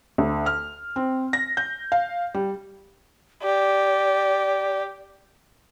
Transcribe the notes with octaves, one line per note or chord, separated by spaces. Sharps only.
D2
F6
C4
A#6
G6
F5
G3
G4 D5